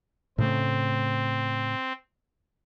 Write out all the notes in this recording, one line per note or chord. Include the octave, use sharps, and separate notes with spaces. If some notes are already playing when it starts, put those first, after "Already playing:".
A2 C#3 A3 C4